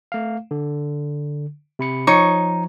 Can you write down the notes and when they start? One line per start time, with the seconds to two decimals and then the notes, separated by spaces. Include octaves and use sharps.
0.12 A3 F5
0.51 D3
1.79 C3 B5 C#7
2.07 F3 D#4 C#5 C#6